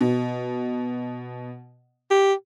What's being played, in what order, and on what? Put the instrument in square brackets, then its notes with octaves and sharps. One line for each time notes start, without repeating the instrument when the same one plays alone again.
[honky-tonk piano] B2
[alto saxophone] G4